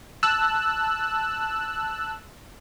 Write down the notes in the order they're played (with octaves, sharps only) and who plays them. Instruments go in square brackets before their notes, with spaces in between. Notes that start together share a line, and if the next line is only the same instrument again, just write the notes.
[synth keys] A5 E6 F#6